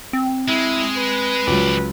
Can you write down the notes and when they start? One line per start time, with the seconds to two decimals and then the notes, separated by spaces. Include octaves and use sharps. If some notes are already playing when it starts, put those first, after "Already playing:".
0.13 C4
0.48 G#3 E4
0.97 B4
1.47 C#2 F3 F#3 D5